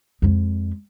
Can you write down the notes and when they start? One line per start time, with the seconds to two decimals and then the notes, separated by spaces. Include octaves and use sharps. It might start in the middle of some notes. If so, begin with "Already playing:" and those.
0.22 F2 G#3